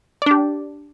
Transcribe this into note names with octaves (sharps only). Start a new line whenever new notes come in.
D4 G4 D5